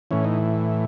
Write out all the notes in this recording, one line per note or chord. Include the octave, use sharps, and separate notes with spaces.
A2 E3 C#4
D#4